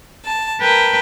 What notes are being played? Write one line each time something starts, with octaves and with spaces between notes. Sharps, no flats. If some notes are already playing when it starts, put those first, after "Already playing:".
A5
A#4 B4 G5 A5 A#5